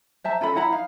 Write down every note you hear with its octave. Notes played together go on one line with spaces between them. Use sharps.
C5 E5 A5 A#5
C#4 A4 B4 B5
E4 F#5 A#5 B5
D#4 F5